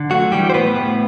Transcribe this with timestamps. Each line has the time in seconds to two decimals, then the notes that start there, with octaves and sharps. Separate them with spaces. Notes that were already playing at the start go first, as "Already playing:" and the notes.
Already playing: D3
0.11 F#3 A3 F#4
0.32 E3 G3 G4
0.50 C5
0.53 A2 B3 B4
0.75 A2